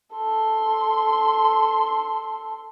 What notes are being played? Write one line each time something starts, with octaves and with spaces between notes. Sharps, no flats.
A4 C6